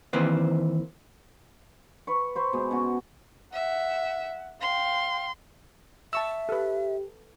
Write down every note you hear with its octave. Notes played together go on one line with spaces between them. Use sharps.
D#3 E3 A#3 C4 B4 C5
B4 C#6
B4 C5 C#6
B2 G#3
B2 C#4 F#4
E5 F#5
F5 G5 C6
E5 A5 C#6 E6
G4 A4 B4